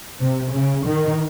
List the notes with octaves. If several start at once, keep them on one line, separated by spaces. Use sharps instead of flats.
C3
C#3
D#3